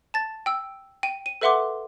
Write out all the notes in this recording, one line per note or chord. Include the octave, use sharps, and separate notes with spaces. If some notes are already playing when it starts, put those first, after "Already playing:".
A5 A6
G5 E6
G5 D#7
D#7
A4 B4 E5 F#5 C6 D6